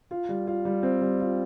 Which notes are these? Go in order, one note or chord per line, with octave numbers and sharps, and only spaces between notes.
F4
G3
F4
G3
C4
G3
F4